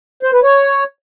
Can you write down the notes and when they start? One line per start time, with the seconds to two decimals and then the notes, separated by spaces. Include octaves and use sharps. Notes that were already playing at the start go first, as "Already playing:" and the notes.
0.23 C5
0.33 B4
0.43 C#5